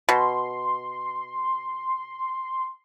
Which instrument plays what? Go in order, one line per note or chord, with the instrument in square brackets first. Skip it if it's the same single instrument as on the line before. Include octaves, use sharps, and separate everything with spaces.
[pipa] B2 [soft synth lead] C6